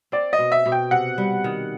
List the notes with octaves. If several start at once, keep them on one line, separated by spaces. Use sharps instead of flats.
C4 D5
D#5
B2
E5
B2
G5
C3 F#5
G3
D#3